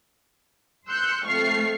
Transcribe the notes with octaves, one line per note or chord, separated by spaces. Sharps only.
C6 E6 F#6 G6 C#7
F2 A3 C#6 F6 C7